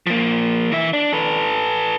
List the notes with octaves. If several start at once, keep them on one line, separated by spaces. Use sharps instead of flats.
F3 A#3
E3 E5
D4
A4 B4